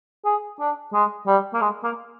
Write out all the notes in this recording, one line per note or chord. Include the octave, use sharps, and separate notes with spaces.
G#4
D4
G#3
G3
A#3
G#3
A#3